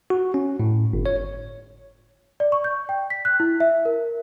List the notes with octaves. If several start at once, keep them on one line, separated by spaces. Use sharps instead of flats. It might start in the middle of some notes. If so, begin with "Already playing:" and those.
F#4
C#4
A2
G1
C#5
D5
C#6
G6
G5
B6
F#6
E4
E5
A#4